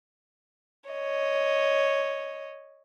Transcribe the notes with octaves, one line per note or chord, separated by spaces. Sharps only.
C#5 D#5